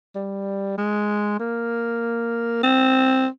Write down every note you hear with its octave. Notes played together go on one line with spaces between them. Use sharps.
G3
G#3
A#3
C4